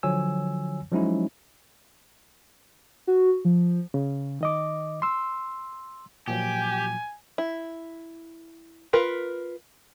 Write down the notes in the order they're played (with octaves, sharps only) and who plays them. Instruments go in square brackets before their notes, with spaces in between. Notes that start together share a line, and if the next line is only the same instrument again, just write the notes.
[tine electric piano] D3 F3 F#3 C#5 G#5 E6
F3 F#3 G#3 C#4 D#4 E4
[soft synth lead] F#4
F3
[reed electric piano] C#3
D#3 D#5 D6
C6 E6
[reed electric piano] A#2 F3 F#3 [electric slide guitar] G4 [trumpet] G#5
[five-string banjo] E4
F4 A#4 B4